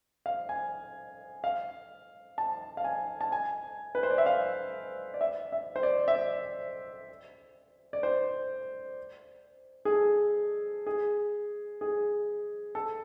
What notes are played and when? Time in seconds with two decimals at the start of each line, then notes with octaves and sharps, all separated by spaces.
0.26 F5
0.49 G#5
1.44 F5
2.38 A5
2.77 F5
2.84 G#5
3.21 A5
3.32 G#5
3.95 B4
4.03 C5
4.11 D5
4.18 E5
4.26 F5
5.14 D5
5.21 E5
5.52 E5
5.76 C5
5.83 D5
6.08 E5
6.15 D5
7.93 D5
8.03 C5
9.85 G#4
9.92 A4
10.87 G#4
11.81 G#4
12.75 A4